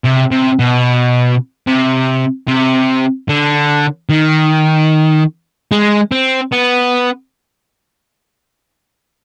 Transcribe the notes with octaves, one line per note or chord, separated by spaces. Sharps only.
C3
C3
B2
C3
C3
D3
D#3
G#3
C4
B3